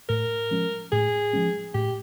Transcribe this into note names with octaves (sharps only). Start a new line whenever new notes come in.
A2 A#4
F3 G#3 C#4
A2 G#4
F3 G#3 C#4
A2 G4